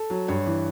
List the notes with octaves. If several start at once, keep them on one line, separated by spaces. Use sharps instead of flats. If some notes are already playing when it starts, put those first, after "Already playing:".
Already playing: A4
F#3
G2 C#5
E3